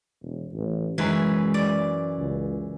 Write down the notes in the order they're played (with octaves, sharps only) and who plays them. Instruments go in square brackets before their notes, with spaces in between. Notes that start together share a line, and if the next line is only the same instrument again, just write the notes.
[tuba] E1
A1
[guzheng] F#2 E3 G#5 [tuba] G#3
[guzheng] D5
[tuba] C#2